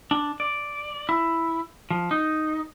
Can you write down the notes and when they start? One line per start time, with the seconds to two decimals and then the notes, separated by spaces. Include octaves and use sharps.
0.11 D4
0.40 D5
1.09 E4
1.91 F3
2.11 D#4